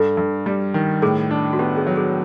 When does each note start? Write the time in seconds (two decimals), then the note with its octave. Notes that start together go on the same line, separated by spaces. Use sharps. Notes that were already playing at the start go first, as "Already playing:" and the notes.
Already playing: G2 A4
0.17 G2
0.46 G3
0.74 D#3
1.02 A2 G#4
1.31 D4
1.53 F#4
1.59 B3 G4
1.77 G#4
1.87 F#3
1.97 G#4